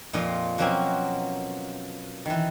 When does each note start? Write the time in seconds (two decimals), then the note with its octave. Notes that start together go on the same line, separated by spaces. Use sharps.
0.13 F2 A#2 F3 F4 D#5 F5
0.58 B2 F3 F#3 A#3 C4 C#4
2.26 D#3 E3